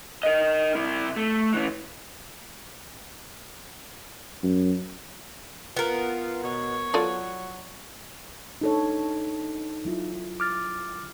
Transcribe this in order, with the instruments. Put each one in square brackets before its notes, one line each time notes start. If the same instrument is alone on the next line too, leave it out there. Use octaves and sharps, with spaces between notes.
[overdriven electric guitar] A#4 D#5
C3 E4
A3
E3 C#4
[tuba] F#2
[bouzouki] B3 A#4 [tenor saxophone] F4
[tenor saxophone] B2 [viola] C#5
[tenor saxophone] F#3 [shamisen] F4 A4 D5
[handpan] D4 A4 C#5 [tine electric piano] D#4
[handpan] F#3 E4 F4
[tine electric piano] D6 F6 A6